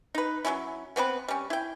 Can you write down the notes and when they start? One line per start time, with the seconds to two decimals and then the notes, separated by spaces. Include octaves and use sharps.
0.15 D#4 B4
0.45 F#3 G3 C#4 E4
0.96 B3 C4 G4 B4
1.28 G3 C#4
1.50 E4 G5